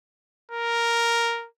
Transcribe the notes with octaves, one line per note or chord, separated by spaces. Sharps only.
A#4